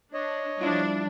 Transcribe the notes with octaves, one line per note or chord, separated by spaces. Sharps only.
D4 C#5 D#5
F3 G3 D4 E4 F4